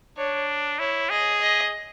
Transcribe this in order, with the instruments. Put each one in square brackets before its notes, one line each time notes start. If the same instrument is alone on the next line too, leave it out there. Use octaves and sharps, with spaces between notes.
[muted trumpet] D4 [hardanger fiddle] C#5
[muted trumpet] E4 [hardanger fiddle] C#5
[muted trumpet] G#4 [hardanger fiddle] D#5
[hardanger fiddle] D#5